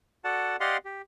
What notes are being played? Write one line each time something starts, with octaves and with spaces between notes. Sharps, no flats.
F#4 A4 D5 F#5 A5
G4 D5 D#5 F5 F#5 C6
G4